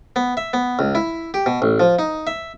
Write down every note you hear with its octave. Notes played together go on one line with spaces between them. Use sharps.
B3
E5
B3
C#2
E4
G4
B2
A1
F3
D#4
E5